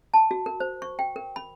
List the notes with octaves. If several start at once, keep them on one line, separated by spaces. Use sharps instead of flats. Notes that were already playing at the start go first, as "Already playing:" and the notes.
A5
F#4
A#4
C5
C#6
G5
A#4
B5